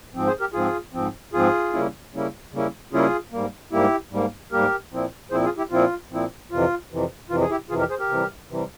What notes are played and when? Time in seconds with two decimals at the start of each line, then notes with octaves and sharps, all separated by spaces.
0.14 G#2 F3 C4
0.27 G#4 C5
0.40 G4 A#4
0.53 G#2 F3 C4 F4 G#4
0.94 G#2 F3 C4
1.33 G#2 F3 C4 F4 G#4
1.73 C#3 G3 A#3 C#4 E4
2.13 C#3 G3 A#3 C#4 E4
2.52 C#3 G3 A#3 C#4 E4
2.93 C#3 G3 A#3 C#4 E4 F4 G#4
3.32 G#2 G3 A#3
3.72 G#2 G3 A#3 E4 G4
4.11 G#2 G3 A#3
4.52 G#2 G3 A#3 G4 A#4
4.92 A#2 F3 C4 E4
5.31 A#2 F3 C4 E4 G#4 C5
5.45 F4 G#4
5.57 E4 G4
5.71 A#2 F3 C4 E4 F4
6.11 A#2 F3 C4 E4
6.51 F2 C3 E3 F4
6.91 F2 C3 E3
7.30 F2 C3 E3 F4
7.41 G#4
7.50 E4 G4
7.69 F2 C3 E3 F4 G#4
7.79 G4 A#4
7.90 G#4 C5
7.99 G4 A#4
8.09 C3 E3 G3
8.50 C3 E3 G3